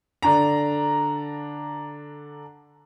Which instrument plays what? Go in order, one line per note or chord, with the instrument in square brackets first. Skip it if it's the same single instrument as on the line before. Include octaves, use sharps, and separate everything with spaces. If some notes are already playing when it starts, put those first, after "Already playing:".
[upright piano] D3 D4 A#5